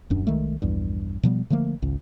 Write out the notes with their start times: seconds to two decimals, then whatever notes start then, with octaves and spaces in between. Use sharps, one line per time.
0.10 D#1 F#2 D4
0.27 C2 D#3 G#3 A3
0.62 A#1 E2 G2
1.23 B2 F3 G3 B3
1.50 D3 F3 A3 A#3
1.82 G#1 C#2